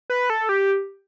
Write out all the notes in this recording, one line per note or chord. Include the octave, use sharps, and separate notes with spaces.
B4
A4
G4